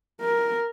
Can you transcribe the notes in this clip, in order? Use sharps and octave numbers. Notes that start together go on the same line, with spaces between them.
A#4